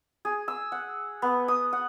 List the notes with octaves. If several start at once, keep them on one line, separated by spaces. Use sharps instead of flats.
G#4
E6
F#5
B3
D#6
F#5